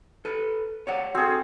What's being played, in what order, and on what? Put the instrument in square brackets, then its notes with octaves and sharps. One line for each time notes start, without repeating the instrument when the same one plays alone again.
[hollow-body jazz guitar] A4 B4
C#5 D5 F#5
[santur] C4 G#4 [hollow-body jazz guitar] F#4 A4